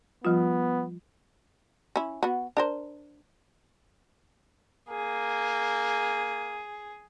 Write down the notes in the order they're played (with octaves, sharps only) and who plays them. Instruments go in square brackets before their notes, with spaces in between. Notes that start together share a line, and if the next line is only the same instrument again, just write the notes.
[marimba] F3 G3 F4 [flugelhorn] B3
[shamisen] C#4 E4
B3 F#4
D4 A#4 C5
[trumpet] A#3 [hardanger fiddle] G#4